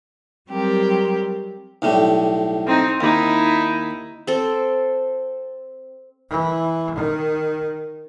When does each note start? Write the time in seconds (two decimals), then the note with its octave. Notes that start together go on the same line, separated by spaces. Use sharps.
0.48 F#3 G3 C4 G4 A#4
1.82 B1 A2 G3
2.67 C4 D#4
3.01 D#2 D#4 E4
4.27 C4 A4
6.30 E3
6.95 D#3